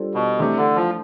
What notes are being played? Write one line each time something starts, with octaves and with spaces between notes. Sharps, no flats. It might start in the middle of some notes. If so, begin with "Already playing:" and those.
Already playing: G3 D4 F4 A4 C5
B2
C3 E3 A3 D4
D3
F3